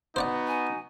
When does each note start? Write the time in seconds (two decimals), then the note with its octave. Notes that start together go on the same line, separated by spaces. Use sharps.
0.16 B3 D#4 F#4 C5 D5 F#5
0.47 G#5